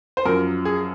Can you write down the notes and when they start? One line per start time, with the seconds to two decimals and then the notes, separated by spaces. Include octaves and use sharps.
0.17 C5
0.25 F#2 F3 A#4
0.65 G#4